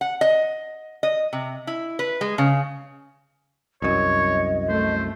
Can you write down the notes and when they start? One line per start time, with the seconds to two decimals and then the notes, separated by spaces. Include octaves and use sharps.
0.01 F#5
0.21 D#5
1.03 D#5
1.33 C3
1.67 E4
1.99 B4
2.21 G#3
2.38 C#3
3.82 C2 F#2 C#5 D#5
4.69 A3 C5